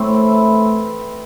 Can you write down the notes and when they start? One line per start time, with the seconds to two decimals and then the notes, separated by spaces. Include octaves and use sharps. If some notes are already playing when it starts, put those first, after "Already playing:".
Already playing: A2 A3 C4
0.09 E3
0.32 E3